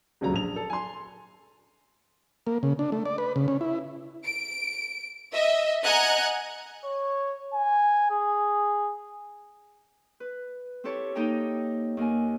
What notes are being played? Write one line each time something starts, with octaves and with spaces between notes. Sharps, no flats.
D#1 C#2 F#3 A#5
A#1 F7
A4
G#5 C6
A#3
C#3
D4
A3
D5
B4
C#3
C#4
E4
D7
D#5 E5
D#5 F#5 G#5 A#5 F#6 G#6
C#5
G#5
G#4
B4
C4 E4 G4 A4 C#5
A#3 D#4 A4 D#5 G5 A#5
D#2 A#3 A#4 G#5